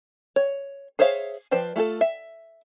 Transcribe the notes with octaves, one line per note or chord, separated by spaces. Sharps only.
C#5
G#4 C5 C#5 E5 F5
F3 B4 C5 D5 G5
A3 F4 G#4 A4
E5